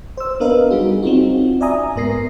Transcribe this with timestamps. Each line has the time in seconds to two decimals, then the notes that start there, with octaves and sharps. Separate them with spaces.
0.17 C5 E6
0.40 B3 D4 A#4 B4 D#5 F5
0.70 G3 D#4 F#4 G#4
1.03 C4 C#4 D#4 F4 F#4
1.61 D5 E5 G#5 A#5 D#6
1.96 G#2 B3 A#4 A#6 C7